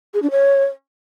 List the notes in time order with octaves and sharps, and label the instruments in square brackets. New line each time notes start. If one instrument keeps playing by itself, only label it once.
[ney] G#4
D4
C#5